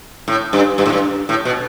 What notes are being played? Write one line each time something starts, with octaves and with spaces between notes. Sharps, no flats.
A2
G2
G2
A2
G2
A2
B2